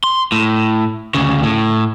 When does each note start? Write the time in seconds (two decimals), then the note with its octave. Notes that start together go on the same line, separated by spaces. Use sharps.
0.04 C6
0.32 A2
1.15 D2 C#3
1.43 A2